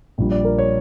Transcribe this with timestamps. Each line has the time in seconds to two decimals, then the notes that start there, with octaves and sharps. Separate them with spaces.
0.18 A#1 A#2 G3
0.31 D5
0.45 A#4
0.58 C#5